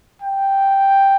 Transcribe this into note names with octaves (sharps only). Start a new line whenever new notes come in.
G5